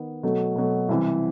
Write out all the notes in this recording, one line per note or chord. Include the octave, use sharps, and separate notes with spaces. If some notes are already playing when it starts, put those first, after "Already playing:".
Already playing: D#3 B3
B2 F#3 A3
B2 F#3 A3
C2 C3 E3